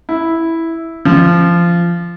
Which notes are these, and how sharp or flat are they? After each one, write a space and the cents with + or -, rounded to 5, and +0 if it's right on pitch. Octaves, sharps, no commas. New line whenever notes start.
E4 -5
F3 -20